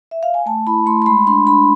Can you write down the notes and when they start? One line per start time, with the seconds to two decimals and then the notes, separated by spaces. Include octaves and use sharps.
0.11 E5
0.23 F5
0.34 G#5
0.46 A3 A5
0.67 E4 B5
0.86 A3 C6
1.02 C6
1.06 G#3 B5
1.27 D4 C6
1.47 D4 B5